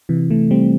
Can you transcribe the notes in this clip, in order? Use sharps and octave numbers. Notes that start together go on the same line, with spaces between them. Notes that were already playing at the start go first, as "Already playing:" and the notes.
C3 E3
E3 A3
G3 C4